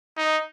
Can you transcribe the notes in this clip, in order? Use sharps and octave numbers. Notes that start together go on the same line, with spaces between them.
D#4